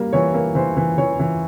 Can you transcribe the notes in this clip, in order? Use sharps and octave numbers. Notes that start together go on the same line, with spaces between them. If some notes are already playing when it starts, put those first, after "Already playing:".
Already playing: G3 A#3
E3 C#5
A#3
E3 C5
E3
E3 C#5
E3